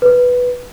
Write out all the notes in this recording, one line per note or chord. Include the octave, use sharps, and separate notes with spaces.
B4